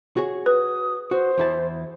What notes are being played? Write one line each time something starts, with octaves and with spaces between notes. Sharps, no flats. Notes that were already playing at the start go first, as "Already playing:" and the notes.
F#4 G#4 C#5
B4 D#6
F#4 C5
E2 E4 A5